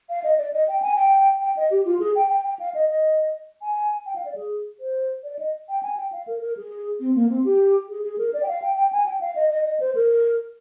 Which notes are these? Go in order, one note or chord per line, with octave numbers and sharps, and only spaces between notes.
F5
D#5
D5
D#5
G5
G#5
G5
G5
D#5
G4
F4
G#4
G5
G5
G5
F5
D#5
D#5
G#5
G5
F5
D5
G#4
C5
D5
D#5
G5
G#5
G5
F5
A#4
A#4
G#4
C4
A#3
C4
G4
G#4
G#4
A#4
D5
G5
F5
G5
G5
G#5
G5
F5
D#5
D#5
D#5
C5
A#4